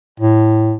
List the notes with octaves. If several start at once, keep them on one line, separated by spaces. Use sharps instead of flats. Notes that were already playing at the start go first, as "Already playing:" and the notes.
A2